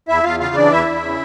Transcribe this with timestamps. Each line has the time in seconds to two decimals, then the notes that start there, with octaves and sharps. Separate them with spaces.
0.08 E2 E4 E5
0.24 E2 F4 F5
0.40 C#3 F4 F5
0.55 E3 D4 D5
0.71 E2 E4 E5
0.87 E2
1.03 C#3